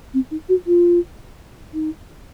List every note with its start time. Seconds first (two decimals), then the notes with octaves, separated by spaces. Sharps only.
0.14 C4
0.31 D#4
0.49 F#4
0.67 F4
1.74 D#4